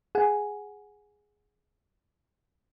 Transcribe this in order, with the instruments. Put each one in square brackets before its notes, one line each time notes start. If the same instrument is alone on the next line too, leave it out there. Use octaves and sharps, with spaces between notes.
[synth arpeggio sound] G#4 F#5 G#5